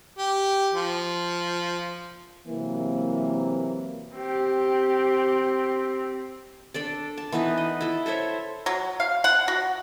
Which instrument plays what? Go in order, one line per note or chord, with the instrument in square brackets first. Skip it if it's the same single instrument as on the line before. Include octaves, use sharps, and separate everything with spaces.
[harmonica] G4
F3
[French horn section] C3 E3 F#3 A#3
[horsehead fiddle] C4 G4
[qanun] D4 A4 D5
A5
E3 B3 D#4 B4
D#5
E4 A4
A4 C5 C#5 E5
[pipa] F#3
F5
F#5
F#4